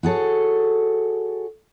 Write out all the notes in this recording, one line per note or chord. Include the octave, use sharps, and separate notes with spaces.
F#4 G#4 A4 C#5